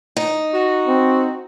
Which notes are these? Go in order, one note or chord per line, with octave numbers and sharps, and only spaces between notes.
D#4
F#4
C4